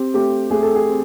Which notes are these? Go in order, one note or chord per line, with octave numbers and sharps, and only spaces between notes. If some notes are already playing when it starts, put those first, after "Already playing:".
Already playing: C4 G4
A3 G4
A3 G#4
A4
G#4
C4